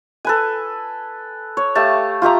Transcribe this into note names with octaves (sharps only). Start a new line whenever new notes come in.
A4 B4 G#5
C#5
A3 G4 F5 A5
F4 G4 E5 A#5